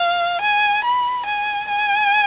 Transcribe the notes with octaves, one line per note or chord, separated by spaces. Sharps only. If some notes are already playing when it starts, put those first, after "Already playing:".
Already playing: F5
G#5
B5
G#5
G#5